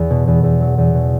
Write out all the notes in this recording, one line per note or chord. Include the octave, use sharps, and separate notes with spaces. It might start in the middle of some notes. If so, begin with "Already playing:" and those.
Already playing: E2
B2
E2
E2
F#3
E2
B2